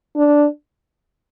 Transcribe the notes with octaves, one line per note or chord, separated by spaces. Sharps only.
D4